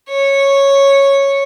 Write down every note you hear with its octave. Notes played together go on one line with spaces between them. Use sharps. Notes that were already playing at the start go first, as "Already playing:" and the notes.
C#5